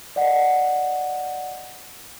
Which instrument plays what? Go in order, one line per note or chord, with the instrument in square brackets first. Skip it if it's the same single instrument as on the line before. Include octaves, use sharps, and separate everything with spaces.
[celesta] D5 D#5 F#5